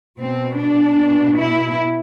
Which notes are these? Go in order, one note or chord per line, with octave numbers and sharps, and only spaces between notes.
B2 C4
D4
B2
E4